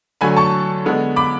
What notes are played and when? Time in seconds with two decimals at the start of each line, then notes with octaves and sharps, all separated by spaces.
0.21 D3 F#3 A3 G#5 B5
0.37 A5 C#6
0.86 D3 G#3 B3
1.16 B5 D6